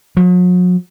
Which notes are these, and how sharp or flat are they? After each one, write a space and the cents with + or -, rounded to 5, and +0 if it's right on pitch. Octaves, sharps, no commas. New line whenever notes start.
F#3 -45